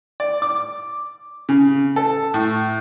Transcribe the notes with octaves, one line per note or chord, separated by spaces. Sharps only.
D5
D6
C#3
A4
A2